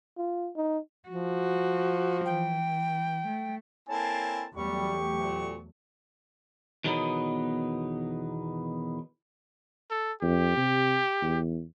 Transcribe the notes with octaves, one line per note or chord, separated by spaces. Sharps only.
F4
D#4
F3 F#4
E3 G5
A3
A#3 C4 E4 A4 C#5 G#5 A5
E2 F#3 G3 A3 G4 C#6
D2 A#2
E2 B2 D#3 F#3 B3 D#4
A4
F2 G4
C3
E2